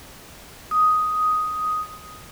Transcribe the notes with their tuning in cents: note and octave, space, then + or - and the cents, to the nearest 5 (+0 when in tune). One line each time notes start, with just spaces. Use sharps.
D#6 +5